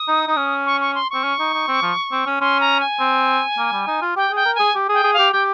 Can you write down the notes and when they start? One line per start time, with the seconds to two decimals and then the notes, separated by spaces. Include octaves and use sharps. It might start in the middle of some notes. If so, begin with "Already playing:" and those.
Already playing: D#6
0.08 D#4
0.27 D#4
0.37 C#4
0.66 C#6
0.81 C#6
0.95 C6
1.10 C4 C#6
1.24 C#4
1.39 D#4
1.54 D#4
1.68 C4
1.83 F3
2.12 C4
2.27 C#4
2.41 C#4 C6
2.61 A#5
2.80 G#5
3.00 C4
3.58 A#3
3.73 G3
3.88 D#4
4.02 F4
4.16 G4 G5
4.31 G#4 G5
4.46 A#4
4.55 G#4 G#5
4.75 G4
4.89 G#4 G5
5.04 G#4
5.14 F5
5.19 G4
5.32 G4 G5